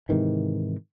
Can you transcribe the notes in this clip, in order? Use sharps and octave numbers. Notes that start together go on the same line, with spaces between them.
G#2 C3 D#3 E3